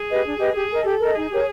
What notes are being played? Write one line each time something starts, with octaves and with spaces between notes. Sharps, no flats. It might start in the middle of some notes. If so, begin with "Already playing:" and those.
Already playing: G#4
G4 B4 D#5
D4
G4 B4 D#5
G4 G#4
A#4 D#5
G4 A4
A#4 D#5
D#4 G#4
G4 A#4 C#5